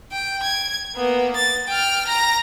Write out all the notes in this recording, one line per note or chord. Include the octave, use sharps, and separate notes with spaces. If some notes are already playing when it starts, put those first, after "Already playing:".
G5
G#6
A#3 B3
A6
G5 F6
A#5 A#6